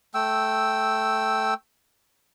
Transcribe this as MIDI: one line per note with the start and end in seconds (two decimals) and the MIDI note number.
0.14 1.54 57
0.14 1.54 79
0.14 1.54 88